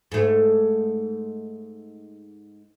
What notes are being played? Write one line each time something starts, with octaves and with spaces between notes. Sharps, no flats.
G#2 A3